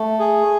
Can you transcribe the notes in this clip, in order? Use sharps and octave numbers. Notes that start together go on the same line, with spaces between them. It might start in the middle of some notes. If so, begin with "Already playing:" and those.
Already playing: A3
G#4